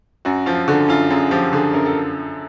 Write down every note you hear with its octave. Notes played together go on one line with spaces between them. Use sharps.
F#2 F#4
F3 F4
D3 F#4
F#2 F4
F#2 G#4
F3 G4
D3 G#4
F#2 A#4
A4